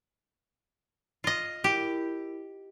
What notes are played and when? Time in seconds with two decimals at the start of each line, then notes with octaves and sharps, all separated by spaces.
1.24 F4 D#5
1.64 E4 G4 A#4 B5